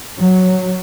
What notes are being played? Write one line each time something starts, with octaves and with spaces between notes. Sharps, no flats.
F#3